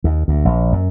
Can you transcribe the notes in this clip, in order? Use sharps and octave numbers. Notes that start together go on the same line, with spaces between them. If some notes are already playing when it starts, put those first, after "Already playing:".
D#2
D2
A#1
F#2